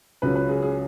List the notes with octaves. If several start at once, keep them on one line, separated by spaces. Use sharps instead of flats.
C#2 C#3 F#3 C#4 B4
B4
G#4
G#4